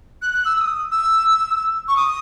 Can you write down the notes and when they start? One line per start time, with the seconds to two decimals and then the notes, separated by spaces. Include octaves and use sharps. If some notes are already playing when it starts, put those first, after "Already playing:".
0.22 F#6
0.34 F#6
0.45 E6
0.56 E6
0.60 D#6
0.91 E6
1.88 C#6
1.96 D#6